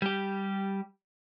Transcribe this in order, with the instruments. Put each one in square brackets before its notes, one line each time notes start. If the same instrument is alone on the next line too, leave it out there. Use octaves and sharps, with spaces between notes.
[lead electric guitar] G3 G4